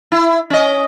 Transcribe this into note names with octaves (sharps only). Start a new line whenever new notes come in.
E4
C#4 D#5